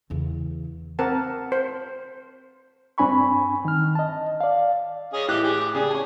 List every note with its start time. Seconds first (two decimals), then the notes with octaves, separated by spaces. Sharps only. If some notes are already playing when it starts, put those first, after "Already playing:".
0.10 E2 C#3
0.99 C4 A#4 F#5 A5
1.52 C5
2.98 G2 C4 D4 G#5 B5 C#6
3.65 D#3 F6
3.95 D#5 A5
4.41 D5 F5
5.14 C#4 G#4 D#5
5.28 A2 E3 G4 F#6
5.44 G4 G#4
5.75 C#3 G#4 D5 D6
5.91 C#5 G#5